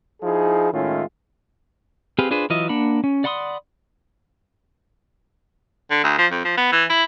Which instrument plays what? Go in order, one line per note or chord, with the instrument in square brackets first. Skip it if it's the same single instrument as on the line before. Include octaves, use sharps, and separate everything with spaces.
[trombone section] F3 D#4 E4 G#4
A2 D#3 G#3 C#4 E4 F4
[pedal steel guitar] C4 G4 G#4 B4 F5
D4 F4 G#4 B4 C5
E3 F#3 F4 D#5 E5
A#3 D4 F#5 B5
C#4
D5 F#5 B5 C6 D#6
[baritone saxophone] D3
D2
F3
F2
F3
B3
E3
E4